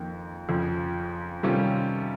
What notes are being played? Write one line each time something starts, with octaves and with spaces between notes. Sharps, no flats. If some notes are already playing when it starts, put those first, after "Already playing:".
Already playing: F2 D#3 A#3
F2 C#3 F3
C3 D#3 G3 C#4 F4